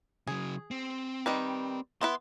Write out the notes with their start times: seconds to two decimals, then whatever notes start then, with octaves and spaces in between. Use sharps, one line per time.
0.27 C#3 F#3 G#4
0.71 C4
1.26 D#3 G3 B4
2.01 B3 E4 B4 C6